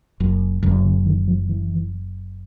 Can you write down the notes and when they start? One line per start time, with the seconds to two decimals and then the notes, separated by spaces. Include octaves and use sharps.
0.20 F#1 F#2
0.63 F#1 F#2 C#3
0.85 C#3
1.06 D#3
1.27 F3
1.49 E3